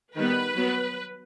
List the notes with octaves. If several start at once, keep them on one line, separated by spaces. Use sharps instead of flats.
D#3 G3 B3 B4
F#3 B3